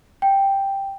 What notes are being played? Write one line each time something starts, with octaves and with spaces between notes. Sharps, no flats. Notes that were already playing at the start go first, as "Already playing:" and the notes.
G5